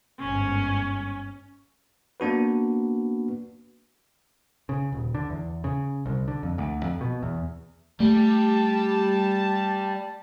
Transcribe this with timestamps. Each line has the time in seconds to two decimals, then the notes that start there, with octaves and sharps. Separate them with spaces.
0.19 G1 G#2 C#4
2.20 A#3 B3 D4 F#4 B4
4.69 C#3
4.92 D#1
5.15 D3
5.30 E2
5.64 C#3
6.06 C2
6.28 D3
6.43 F2
6.58 D2
6.83 F2
7.01 B2
7.23 E2
8.00 G3 A3 G4 A5